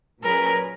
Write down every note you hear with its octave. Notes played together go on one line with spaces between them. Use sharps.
A#2 F#3 C#4 G#4 A#4 B4